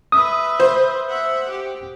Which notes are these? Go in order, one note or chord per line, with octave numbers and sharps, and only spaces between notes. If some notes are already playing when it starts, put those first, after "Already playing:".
B4 E5 D#6
C5
E5 F#5
G4